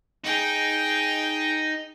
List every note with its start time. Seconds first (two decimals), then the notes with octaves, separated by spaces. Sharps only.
0.24 D#4 G#4 G5